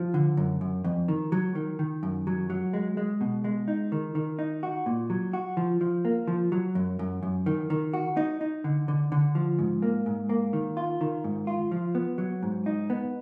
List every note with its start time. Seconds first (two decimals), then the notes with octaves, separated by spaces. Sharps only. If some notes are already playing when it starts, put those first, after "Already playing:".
Already playing: F3
0.14 D3
0.37 F#2
0.61 F#2
0.84 F2
1.08 D#3
1.32 F#3
1.55 D#3
1.79 D#3
2.03 F#2
2.27 F#3
2.50 F#3
2.73 G#3
2.97 G#3
3.21 B2
3.44 G#3
3.68 D#4
3.92 D#3
4.15 D#3
4.39 D#4
4.63 F#4
4.86 A#2
5.10 F#3
5.33 F#4
5.57 F3
5.81 F3
6.05 A#3
6.28 F3
6.52 F#3
6.75 F#2
6.99 F#2
7.23 F#2
7.46 D#3
7.70 D#3
7.94 F#4
8.17 D#4
8.41 D#4
8.64 D3
8.88 D3
9.12 D3
9.35 F3
9.59 G#2
9.82 A#3
10.06 G#2
10.29 A#3
10.53 D#3
10.77 F4
11.01 D#3
11.24 G#2
11.47 F4
11.72 F3
11.95 B3
12.18 F#3
12.43 G#2
12.66 D#4
12.90 B3